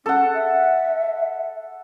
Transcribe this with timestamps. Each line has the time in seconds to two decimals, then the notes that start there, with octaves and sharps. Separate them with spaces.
0.06 C#4 A4 F#5
0.34 E5